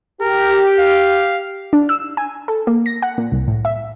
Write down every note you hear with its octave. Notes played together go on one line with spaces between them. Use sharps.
G4 A#4
F5
D4
E6
G#5
A4
A#3
A#6
F#5
A#2
C2
A2
E5